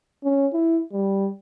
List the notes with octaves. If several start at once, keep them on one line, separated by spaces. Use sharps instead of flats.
C#4
E4
G3